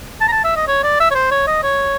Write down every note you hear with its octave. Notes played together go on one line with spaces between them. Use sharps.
A5
A#5
A5
E5
D#5
C#5
D5
E5
C#5
C5
C#5
D#5
C#5